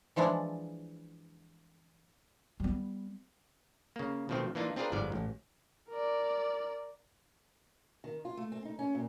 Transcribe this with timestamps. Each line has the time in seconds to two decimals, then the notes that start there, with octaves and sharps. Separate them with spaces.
0.16 E3 F3 G#3 D4 E4
2.60 G3 B3
3.96 C#3 A#3
4.29 B2 D#3 F3 A3 C4
4.55 E3 A#3 D4 D#4 F4
4.76 C4 D4 F4 G#4 A#4 B4
4.92 G1 G#2 F3 D5
5.12 A1
5.89 A#4 D5
8.04 D#3
8.25 F4
8.37 A3
8.52 C4
8.65 D#4
8.79 C#4
8.95 A#2